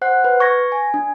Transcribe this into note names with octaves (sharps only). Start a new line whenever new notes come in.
C5 F#5 F#6
B4
C#6 G#6 A#6
G#5
D4